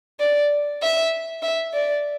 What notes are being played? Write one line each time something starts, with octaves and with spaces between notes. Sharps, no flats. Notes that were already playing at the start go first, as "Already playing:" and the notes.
D5
E5
E5
D5